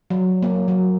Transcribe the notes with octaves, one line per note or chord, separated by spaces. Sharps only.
F#3
A#3
F#3